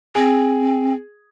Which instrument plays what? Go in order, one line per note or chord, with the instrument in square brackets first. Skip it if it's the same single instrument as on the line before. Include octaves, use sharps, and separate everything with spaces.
[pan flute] C4 [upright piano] G#4